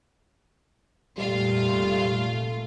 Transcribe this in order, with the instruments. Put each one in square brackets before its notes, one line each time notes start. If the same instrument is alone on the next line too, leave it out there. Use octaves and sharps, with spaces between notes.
[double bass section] F1 A#2 A3 [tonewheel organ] G3 [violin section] F4 F5